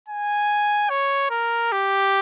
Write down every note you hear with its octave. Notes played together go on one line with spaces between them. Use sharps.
G#5
C#5
A#4
G4